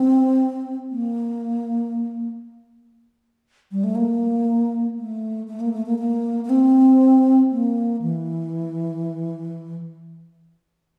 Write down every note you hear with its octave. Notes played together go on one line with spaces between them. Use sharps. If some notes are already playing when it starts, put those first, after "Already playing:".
Already playing: C4
A#3
G3
A3
A#3
A3
A3
A#3
A3
A#3
A#3
A#3
C4
A#3
E3